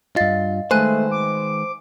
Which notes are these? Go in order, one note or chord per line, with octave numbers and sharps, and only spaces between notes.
G2 F4 D#5 F5 A6
D#3 G#3 A3 B4 C5 G#5 F#6
D6